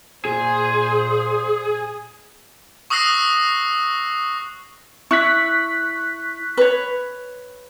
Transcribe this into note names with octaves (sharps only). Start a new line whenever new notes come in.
A#2 G#4 C5
C#6 D#6 E6 F#6 A#6 C7
E4 C#6 F#6 B6
B4 C#5